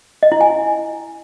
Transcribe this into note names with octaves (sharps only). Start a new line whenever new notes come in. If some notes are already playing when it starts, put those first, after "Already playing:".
D#5
E4
G#5